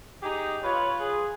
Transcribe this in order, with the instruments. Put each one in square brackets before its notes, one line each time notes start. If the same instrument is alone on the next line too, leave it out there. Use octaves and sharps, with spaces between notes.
[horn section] D#4 G4 G#4
[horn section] F4 B4 [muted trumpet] C#5
[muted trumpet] G#4